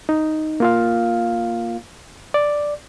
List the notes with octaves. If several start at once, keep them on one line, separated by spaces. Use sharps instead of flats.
D#4
A#3 F4 F5
D5